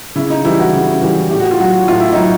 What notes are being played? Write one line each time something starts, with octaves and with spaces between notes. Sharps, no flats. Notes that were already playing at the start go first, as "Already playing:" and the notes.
C#3 E4
D#4
E3 G3 E4
F#4
C#3
E3 G3
A2 G4
F#4
F4
F#3 F#4
A2 F4
E4
F#3 D#4